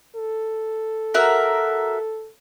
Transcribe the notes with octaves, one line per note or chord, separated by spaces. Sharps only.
A4
F#4 A#4 E5